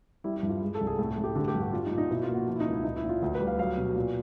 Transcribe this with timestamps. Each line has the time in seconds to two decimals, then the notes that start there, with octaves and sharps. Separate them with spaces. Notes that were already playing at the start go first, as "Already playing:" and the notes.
0.24 G3 E4
0.36 E4
0.43 G2
0.49 F4
0.62 G#3
0.75 A4
0.81 C2
0.87 G#4
0.98 A2 A4
1.11 G#4
1.18 A2
1.24 G4
1.35 D3 G4
1.48 G4
1.55 G2
1.61 F#4
1.73 G3 F4
1.86 D#4
1.91 A#2
1.98 D#4
2.10 B2 E4
2.23 F4
2.28 A#3
2.34 F#4
2.47 F3 F4
2.55 E4
2.60 D#4
2.67 C#2
2.73 E4
2.84 A#2 D#4
2.97 E4
3.04 A#2
3.09 F4
3.22 D2 F#4
3.35 B4
3.40 G3
3.47 F5
3.59 F#3 F5
3.78 B2
3.96 A#2